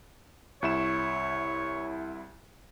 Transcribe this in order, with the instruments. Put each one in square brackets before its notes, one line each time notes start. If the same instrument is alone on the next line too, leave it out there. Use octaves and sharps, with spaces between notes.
[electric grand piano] C2 E4 E7 [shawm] C#5